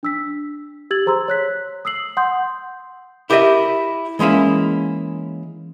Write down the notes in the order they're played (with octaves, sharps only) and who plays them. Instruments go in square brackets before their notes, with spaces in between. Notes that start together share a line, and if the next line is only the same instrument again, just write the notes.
[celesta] D4 E6 B6
G4 E6 G#6 A6 F#7
G#4 C5 A#5 C6 E6
C#5 F#6 B6
D#6 E6 C7 F#7
F#5 C6 D#6 G6
[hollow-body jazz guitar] E4 G4 A#4 C5 D#5 E5
E3 G#3 A#3 C#4 E4